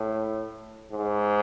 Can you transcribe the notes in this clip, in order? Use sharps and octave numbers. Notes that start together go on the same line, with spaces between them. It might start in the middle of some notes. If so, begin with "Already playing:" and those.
Already playing: A2
G#2